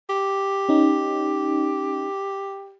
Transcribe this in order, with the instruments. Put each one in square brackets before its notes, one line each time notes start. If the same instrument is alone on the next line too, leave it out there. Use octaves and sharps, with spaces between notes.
[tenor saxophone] G4
[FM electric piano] C#4 D#4